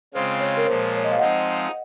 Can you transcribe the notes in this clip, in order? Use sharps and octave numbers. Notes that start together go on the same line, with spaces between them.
C#3 G#3 C4 F4 C5
C#5
A#4
A#2 F3 G#3 C5
C#5
D#5
F5
F3 G#3 C4 D#4 D#5 F#5